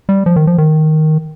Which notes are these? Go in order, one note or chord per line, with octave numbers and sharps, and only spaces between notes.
G3
F3
D#3
F3
D#3